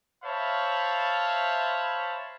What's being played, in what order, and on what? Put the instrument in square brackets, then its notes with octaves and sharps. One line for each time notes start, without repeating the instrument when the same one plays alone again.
[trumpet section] C5 C#5 E5 F5 A5 B5